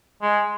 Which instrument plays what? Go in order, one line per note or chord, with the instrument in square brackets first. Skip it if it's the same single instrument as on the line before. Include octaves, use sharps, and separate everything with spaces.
[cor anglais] G#3